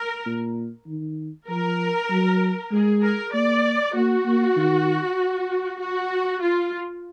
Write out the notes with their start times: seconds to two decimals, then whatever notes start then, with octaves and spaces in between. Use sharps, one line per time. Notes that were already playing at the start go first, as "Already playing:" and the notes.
Already playing: A#4
0.26 A#2
0.87 D#3
1.49 F3 A#4
2.10 F#3
2.72 G#3 G#4
3.03 A#4
3.33 A#3 D5
3.95 A#3 F#4
4.26 A#3
4.57 D#3
5.80 F#4
6.42 F4